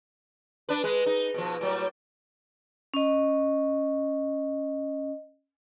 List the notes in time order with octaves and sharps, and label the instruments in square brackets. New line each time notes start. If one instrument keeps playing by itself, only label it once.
[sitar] D4 B4
G#3 B4
D#4
B2 F3
A2 F#3 G3
[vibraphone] C#4 D#5